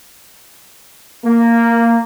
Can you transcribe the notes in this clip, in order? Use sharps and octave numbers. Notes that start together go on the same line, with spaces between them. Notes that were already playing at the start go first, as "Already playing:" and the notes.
A#3